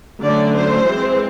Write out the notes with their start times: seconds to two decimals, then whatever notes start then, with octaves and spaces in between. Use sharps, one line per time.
0.23 D3 F#3 A3 C#4 D5
0.55 C5
0.85 E3 G#3 C4